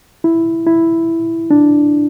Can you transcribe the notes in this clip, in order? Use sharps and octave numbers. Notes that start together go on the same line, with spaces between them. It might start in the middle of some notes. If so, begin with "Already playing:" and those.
E4
E4
D4